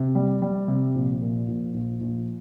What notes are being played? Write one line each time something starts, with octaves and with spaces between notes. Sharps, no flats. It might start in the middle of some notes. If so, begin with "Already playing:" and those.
Already playing: C3
G3
G3
C3
A#1
A#2
A#1
A#1
A#1